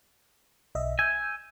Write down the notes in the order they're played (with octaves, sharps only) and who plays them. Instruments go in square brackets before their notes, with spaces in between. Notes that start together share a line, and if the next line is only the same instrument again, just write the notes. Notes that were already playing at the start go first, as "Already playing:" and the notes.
[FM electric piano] B1 D#5 E5
[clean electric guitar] G#5 [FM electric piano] E6 G6